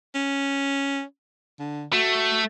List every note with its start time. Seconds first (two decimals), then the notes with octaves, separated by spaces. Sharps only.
0.14 C#4
1.59 D3
1.93 A3 F#4